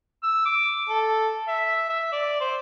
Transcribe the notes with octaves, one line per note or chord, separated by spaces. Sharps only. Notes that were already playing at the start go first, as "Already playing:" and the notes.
E6
D6
A4
E5
E5
D5
C5